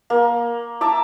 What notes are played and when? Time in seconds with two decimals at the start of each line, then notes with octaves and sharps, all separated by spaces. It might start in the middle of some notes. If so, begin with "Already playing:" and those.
0.10 A#3
0.81 E5 A5 A#5 D6